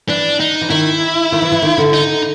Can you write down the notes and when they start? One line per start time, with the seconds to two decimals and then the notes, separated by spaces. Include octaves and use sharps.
0.09 E3 D4
0.40 D#4
0.61 E3
0.70 D#3 E4
1.32 D#3
1.42 E3
1.52 E3
1.62 D#3
1.78 D3
1.93 D#4